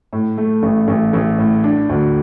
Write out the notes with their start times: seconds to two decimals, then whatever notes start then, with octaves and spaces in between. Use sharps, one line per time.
0.13 A2
0.38 A3
0.63 A1
0.88 A1
1.13 A1
1.39 A2
1.64 D4
1.89 D2